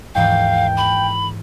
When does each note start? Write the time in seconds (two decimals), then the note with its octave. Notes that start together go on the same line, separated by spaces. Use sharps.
0.15 D#2 G#2 E3 F5 G5
0.77 B5 D6